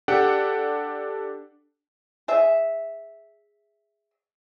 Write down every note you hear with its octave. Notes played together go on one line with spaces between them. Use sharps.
D4 G4 A4 F#5 G5
G#4 E5